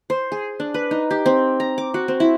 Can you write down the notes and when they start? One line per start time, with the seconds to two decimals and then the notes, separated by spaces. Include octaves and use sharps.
0.10 C5
0.32 G#4
0.60 D4
0.74 B4
0.91 D#4
1.11 G4
1.26 C4
1.60 A#5
1.78 D6
1.94 F#4
2.08 C4
2.20 E4